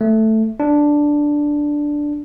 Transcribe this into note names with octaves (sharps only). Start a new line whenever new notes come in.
A3
D4